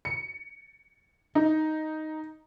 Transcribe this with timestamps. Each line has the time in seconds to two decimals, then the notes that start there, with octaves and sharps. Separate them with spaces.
0.05 C#7
1.35 D#4